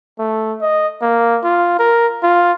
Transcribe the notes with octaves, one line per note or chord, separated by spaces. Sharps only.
A3
D#5
A#3
F4
A#4
F4